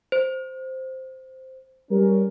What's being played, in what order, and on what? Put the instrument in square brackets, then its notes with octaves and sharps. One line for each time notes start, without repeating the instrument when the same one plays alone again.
[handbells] C5
[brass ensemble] G3 C#4 A#4